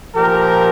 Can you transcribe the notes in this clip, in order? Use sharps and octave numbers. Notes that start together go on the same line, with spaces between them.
A#2 F3 G4 A#4